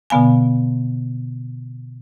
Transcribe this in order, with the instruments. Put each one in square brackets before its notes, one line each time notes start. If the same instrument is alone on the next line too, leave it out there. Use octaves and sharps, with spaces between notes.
[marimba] B2 D3 B3 F5 G#5